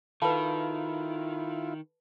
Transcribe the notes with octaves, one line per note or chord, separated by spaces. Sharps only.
D#3 E4 F4 A4 B4 F5 A5 B5